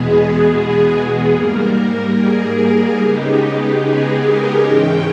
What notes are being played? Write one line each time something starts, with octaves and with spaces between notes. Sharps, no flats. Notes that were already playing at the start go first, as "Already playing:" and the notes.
Already playing: E2 B2 G#3 B3 G#4
G#2 G3 A#3 A#4
A#4
G#4
C#3 G#3 B3 D#4 G4
G#4
A#4
G#2 E3 G#3 C#4 G5